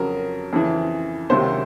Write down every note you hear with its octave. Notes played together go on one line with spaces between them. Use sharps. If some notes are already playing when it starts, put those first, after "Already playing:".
Already playing: F2 C#3 F#3 A#4
F2 C#3 E3
C#2 C3 D#3 F#3 C5